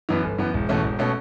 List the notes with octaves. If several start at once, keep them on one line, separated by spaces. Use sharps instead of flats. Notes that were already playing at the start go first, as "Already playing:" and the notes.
F#2 E3 B3
G1
F#2 E3 B3
E1
E2 B2 A3 C#4
E1
B2 A3 C#4